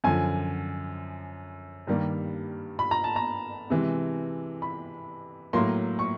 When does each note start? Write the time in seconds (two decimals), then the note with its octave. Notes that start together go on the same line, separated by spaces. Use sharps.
0.04 F#2 D3 F3 G#5
1.87 G2 D#3 G3 A#3
2.79 B5
2.91 A#5
3.04 A5
3.16 A#5
3.70 C3 E3 G#3
4.62 B5
5.53 A2 F#3 A#3 C6
5.99 C#6